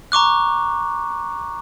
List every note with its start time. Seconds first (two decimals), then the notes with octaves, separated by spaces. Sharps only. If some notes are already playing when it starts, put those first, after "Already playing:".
0.12 A#5 C#6 D6 F#6